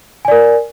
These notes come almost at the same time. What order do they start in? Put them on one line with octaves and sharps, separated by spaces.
G#5 D5 A#4